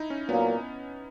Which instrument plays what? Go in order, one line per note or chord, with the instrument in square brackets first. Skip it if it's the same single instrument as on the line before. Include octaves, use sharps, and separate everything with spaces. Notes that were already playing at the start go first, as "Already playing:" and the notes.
Already playing: [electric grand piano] D#4 E4
C#4
[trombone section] A#2 F#3 A#3 [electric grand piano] B3